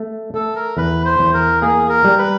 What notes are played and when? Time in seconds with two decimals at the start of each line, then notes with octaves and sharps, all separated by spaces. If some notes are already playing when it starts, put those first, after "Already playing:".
Already playing: A3
0.34 A3 A4
0.56 A#4
0.77 E2 B4
1.05 C5
1.19 E2
1.34 A#4
1.62 A#3 G#4
1.89 A#4
2.04 G3
2.18 B4